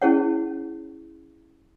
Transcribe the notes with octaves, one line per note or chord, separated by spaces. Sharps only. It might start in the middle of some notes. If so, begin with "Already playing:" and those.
C#4 E4 G#4 C#5 F#5